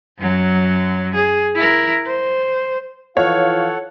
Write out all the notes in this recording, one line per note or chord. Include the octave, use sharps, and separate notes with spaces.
F#2 F#3
G#4
E4 A#4
C5
E3 F3 F4 A4 C#5 F5 F#5